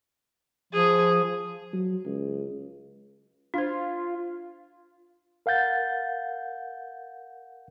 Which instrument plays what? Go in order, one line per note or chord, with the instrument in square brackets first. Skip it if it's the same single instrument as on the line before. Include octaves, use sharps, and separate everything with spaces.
[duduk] F3 [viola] G#4
[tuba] F#3
C#2
[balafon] D4 C5 [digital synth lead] F4
[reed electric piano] A#4 F5 F#5 G6 A6